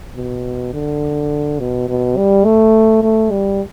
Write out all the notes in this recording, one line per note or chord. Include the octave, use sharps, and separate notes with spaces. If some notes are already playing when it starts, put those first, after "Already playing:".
B2
D3
B2
B2
G3
A3
A3
G3